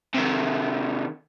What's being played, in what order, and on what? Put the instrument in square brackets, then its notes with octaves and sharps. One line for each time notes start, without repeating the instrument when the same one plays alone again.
[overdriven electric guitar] C3 D#3